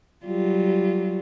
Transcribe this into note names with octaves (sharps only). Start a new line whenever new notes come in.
F#3 G3 F4